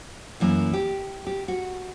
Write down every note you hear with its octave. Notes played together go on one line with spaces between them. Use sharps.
F#2 E3 A#3
G4
G4
F#4